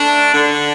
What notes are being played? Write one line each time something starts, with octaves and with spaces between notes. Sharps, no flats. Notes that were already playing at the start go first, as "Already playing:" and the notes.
Already playing: A3 D4
D3